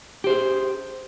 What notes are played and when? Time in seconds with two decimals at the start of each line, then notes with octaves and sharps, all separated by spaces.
0.24 G4
0.27 C5
0.29 G#4